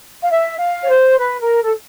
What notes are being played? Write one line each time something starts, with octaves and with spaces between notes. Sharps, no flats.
F5
E5
F5
C#5
C5
B4
A#4
A4